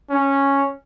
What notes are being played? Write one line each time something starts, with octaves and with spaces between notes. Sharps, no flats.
C#4